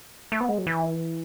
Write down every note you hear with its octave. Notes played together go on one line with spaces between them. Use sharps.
A3
B3
G#3
F#3
E3